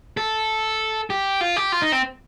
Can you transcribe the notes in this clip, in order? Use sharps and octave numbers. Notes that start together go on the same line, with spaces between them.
A4
G4
F4
G4
F4
D#4
C4